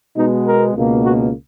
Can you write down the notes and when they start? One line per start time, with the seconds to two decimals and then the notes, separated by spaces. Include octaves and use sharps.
0.16 B2 G#3 B3 D#4
0.46 A#4
0.75 C#2 B2 A#3
1.03 F#4